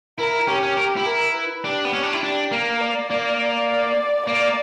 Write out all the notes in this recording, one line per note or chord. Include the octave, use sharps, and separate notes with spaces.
E4 A#4
C#4 G4
C#4
A#4
E4
A#4
B4
D4 G4
B3
C#4
D4
E4
D4 G4
A#3 A#4
D5
A#3
D5
A#3 D5